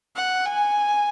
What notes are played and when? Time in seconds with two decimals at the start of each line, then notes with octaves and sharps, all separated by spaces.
0.16 F#5
0.46 G#5